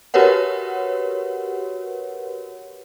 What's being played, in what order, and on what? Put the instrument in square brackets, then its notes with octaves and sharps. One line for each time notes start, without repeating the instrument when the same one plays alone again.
[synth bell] F#4 G4 A#4 B4 C#5 F#5